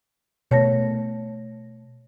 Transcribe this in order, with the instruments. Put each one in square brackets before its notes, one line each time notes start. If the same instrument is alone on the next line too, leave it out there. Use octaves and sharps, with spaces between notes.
[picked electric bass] B2 A3 [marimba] C#5 A5 A#6